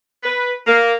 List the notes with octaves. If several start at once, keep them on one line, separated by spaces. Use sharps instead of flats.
B4
A#3